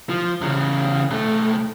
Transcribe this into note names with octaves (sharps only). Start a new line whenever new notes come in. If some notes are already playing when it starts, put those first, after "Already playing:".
F3
E2 C#3
B1 A3